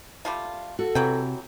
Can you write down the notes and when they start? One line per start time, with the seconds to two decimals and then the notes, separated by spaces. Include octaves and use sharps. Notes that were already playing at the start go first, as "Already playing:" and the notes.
0.25 G3 A3 F4
0.79 F#4 A4
0.95 C3 E3 F#3 G5